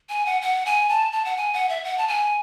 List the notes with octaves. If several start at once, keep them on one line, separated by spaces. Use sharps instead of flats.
G#5
F#5
F#5
G#5
A5
A5
F#5
G#5
F#5
E5
F#5
A5
G#5